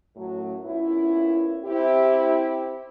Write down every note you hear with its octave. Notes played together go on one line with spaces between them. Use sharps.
F#2 A2 F#3
A#2 B3 C#4 E4
C4 E4 G4